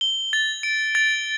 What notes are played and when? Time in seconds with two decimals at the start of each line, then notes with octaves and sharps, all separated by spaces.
0.01 G7
0.33 A6
0.63 D7
0.95 A6